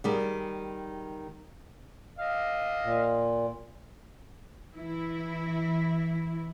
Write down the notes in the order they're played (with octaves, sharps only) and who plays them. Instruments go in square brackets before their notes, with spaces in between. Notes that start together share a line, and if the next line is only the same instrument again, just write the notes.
[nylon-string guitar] D#3 G3 G#4
[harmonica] D#5 F5
[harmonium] A#2
[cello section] E3 E4